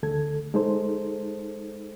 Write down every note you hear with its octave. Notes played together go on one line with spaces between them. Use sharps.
D2 A4 G#6
G#3 D#4 A4 C5